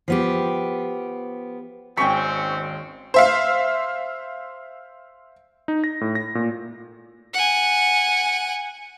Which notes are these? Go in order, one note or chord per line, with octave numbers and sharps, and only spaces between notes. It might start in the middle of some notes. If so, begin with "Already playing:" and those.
F3 B3 G4
G#1 D#2 G#3 C4 C#4 G5 C#6 B6
C5 E5 F5
D#4
A#6
A2
A#6
A#2
F#5 G#5